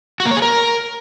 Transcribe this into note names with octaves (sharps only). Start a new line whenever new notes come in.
F#4
A#3
C#5
G#4
A#4